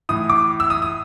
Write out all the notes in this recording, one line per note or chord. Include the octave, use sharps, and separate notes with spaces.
A2 E3 D#6
D6
E6
D#6
D#6